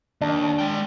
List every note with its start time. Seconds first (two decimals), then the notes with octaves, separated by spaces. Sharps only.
0.21 D#2 D4
0.59 G#3 G5